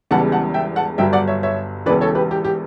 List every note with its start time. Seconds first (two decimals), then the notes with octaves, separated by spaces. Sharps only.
0.11 E1 E2 C#3 E3 G3 F#5 A5
0.32 F#5 A5
0.54 E5 G5
0.76 F#5 A5
0.98 G1 G2 F#3 E5 G5
1.13 D5 F#5
1.28 C#5 E5
1.43 C#5 E5
1.86 E1 E2 C#3 E3 B4 D5
2.01 A4 C#5
2.15 G4 B4
2.31 G4
2.45 G4